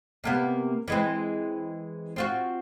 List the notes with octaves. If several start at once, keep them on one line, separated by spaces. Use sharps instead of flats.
C3 A#3 B3
E3 G#3 C4
C4 F4 F#4